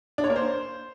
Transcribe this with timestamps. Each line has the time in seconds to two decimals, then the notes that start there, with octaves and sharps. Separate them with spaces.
0.18 D4
0.24 C#5
0.30 A#3
0.36 C5